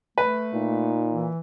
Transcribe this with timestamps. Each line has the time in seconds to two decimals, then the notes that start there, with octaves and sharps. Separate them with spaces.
0.18 A3 B4
0.54 A#2 D#4
1.09 E3